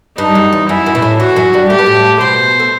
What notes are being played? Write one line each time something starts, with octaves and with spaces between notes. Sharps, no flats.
G2 D#4
F#2
E2
F#2 E4
F#2
B2
A2
E2 E3 F#4
F#2 F#3
G2 G3
A3 G4
B3
A2 A3
B2 B3 C5
A3